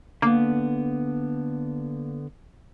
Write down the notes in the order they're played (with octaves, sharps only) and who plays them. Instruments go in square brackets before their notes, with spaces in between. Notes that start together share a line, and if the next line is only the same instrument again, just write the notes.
[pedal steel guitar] D3 B3 [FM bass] A#3